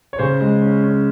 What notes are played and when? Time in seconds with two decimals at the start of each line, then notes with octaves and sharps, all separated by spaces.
0.13 C#5
0.19 C#3 C5
0.41 G#3
0.62 C#4
0.84 C#4